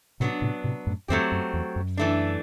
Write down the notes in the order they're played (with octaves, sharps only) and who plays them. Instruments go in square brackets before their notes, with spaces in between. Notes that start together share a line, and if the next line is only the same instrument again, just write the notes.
[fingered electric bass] A2 C3 [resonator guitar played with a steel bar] F#3 B3 D4
[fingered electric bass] A2 C3
A2 C3
F#2 A2
[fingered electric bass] E2 G2 [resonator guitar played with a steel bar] F#3 A3 C4 G4
[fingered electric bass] F#2
E2
F#2
[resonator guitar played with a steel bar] E3 A3 D4